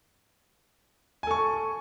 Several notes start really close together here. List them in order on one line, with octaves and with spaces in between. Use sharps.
G#5 A4 C#6